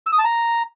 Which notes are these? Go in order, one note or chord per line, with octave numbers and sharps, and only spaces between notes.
E6
D#6
A5
A#5